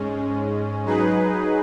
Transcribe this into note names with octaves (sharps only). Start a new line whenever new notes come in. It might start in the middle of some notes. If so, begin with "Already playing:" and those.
Already playing: G#2 G#3 C#4
F#3 D#4 G#4 B4